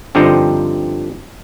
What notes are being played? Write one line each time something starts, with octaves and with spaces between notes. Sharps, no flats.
G2 D3 F3 C4 D#4 A#5